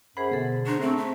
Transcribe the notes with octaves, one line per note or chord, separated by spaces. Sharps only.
F#2 G#4 C5 F#5 B5
B2 D3 G#4 A4
D4 C5 A#5 C#6
A3 C4
E5